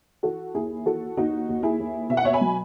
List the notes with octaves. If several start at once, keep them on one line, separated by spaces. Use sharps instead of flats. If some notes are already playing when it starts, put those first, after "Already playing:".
E3 F#4 A4
D#2 E4 G#4
E3 F#4 A4
D#2 D#4 F#4
D#2
E4 G#4
D#2
B2 E5
F#5
C#5 E5
G#5 B5
F#3